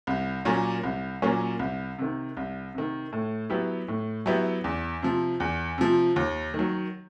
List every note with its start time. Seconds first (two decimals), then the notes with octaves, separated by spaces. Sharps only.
0.07 C2
0.45 A#2 F#3 A#3 C#4
0.83 C2
1.22 A#2 F#3 A#3 C#4
1.59 C2
1.99 C3 D#3
2.37 C2
2.74 C3 D#3
3.13 A2
3.50 F#3 B3 E4 G4
3.88 A2
4.26 F#3 B3 E4 G4
4.64 E2
5.02 C3 F3
5.40 E2
5.78 C3 F3
6.16 D#2
6.54 D#3 F#3